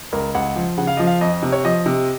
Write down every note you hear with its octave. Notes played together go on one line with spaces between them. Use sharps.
C#2 A#4
C#2 F#5
F3
C#3 F#5
F5
F3 D#5
F5
F2 D#5
C3
C#5
F3 D#5
C3